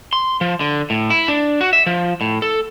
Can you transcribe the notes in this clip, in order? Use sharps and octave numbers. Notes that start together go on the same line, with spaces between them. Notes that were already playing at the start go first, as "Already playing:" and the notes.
C6
F3
D3
A2
E4
D4
F#4
E5
F3
A2
A4